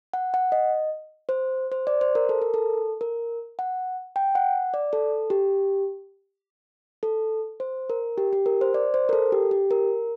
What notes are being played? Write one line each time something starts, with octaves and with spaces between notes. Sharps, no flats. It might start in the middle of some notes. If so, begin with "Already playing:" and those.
F#5
F#5
D#5
C5
C5
D5
C5
A#4
A4
A#4
A4
A#4
F#5
G5
F#5
D5
A4
G4
A4
C5
A#4
G4
G4
A#4
C5
D5
C5
A#4
A4
G4
G4
A#4